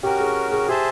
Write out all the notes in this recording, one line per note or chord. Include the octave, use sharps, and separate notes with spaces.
C#4 F#4 G4 A#4
G#4
G#4
G4 G#4 C5 E5 A5